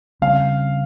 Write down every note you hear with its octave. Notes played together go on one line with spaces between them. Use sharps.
C#3 G3 C4 F5